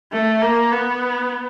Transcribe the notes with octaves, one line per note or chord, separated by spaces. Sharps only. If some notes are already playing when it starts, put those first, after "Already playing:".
A3
A#3
B3